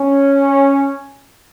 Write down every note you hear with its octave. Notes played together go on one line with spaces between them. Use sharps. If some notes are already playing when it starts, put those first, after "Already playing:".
Already playing: C#4